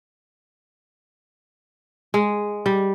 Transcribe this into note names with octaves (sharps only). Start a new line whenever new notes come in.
G#3
G3